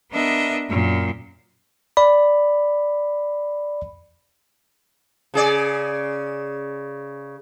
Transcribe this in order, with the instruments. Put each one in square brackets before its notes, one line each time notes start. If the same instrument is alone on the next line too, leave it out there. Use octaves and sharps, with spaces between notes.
[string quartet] B3 D4 A#4 D#5 E5
F#2 A#2
[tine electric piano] D5 B5
[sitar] C#3 G#4 D5